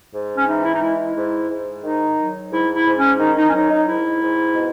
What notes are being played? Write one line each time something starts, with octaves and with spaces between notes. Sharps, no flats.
G#2
C#4
E3 D#4
E4
D#4
G#3 E4
E4
G#2
G#2
D#3 D#4
F#3
G#2 E4
E4
G#2
C#4
D#3 D#4
D#4
C#4
F#3 D#4
D#4
G#2 E4
G#2
B2